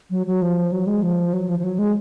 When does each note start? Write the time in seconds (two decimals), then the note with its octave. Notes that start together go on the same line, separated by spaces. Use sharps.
0.11 F#3
0.27 F#3
0.42 F3
0.72 F#3
0.87 G#3
1.03 F3
1.33 F#3
1.49 F3
1.59 F3
1.63 F#3
1.79 G#3